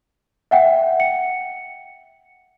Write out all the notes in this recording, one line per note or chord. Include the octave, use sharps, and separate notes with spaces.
E5 F#5 G5
C#7